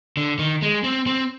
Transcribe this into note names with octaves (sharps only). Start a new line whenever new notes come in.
D3
D#3
G#3
C4
C4